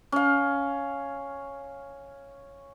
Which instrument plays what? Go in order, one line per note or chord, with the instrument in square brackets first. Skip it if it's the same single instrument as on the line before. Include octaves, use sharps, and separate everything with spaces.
[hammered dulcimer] C#4 F5